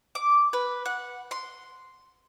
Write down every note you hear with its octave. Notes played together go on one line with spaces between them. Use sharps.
D6
B4
F#5
C6